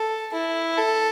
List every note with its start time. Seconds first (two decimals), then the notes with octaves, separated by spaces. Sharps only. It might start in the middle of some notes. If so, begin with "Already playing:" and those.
Already playing: A4
0.33 E4
0.78 A4